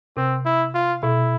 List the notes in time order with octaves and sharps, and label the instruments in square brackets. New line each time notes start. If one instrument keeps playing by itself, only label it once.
[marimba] C3 [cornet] C4
[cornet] E4
F4
[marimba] B2 [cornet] E4